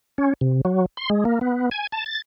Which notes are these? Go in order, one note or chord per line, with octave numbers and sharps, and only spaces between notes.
C#4
C3
F#3
C6
G#3
A#3
B3
G#5
A5
A6